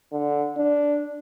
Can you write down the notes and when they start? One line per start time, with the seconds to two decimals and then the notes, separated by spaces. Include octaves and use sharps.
0.12 D3
0.57 D4